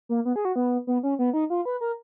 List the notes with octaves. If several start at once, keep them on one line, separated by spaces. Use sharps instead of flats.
A#3
B3
G#4
F#4
B3
B3
C#4
B3
D#4
F4
B4
A#4